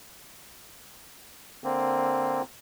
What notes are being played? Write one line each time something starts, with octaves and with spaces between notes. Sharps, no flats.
D3 A#3 C4